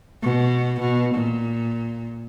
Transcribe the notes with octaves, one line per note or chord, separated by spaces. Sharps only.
B2
B2
A#2